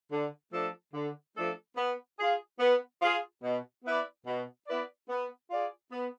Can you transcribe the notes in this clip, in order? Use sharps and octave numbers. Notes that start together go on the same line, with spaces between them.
D3
F3 A3 D4 A4
D3
F3 A3 D4 A4
B3
F4 G#4
B3
F4 G#4
B2
B3 E4 B4 D5
B2
B3 E4 B4 D5
B3
F4 G#4 D5
B3